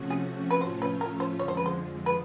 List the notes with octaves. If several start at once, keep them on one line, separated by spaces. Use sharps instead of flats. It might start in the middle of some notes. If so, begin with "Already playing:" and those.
Already playing: C3 F3 A3 C#4 F#4
G#4
B4
A2 F3 A3 C#4 F4 C5
B4
A#4
C5
F2 D3 F3 G#3 C#5
C5
B4
C5
B4